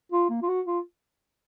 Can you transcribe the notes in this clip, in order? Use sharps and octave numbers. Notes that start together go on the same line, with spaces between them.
F4
A#3
F4
F#4
F4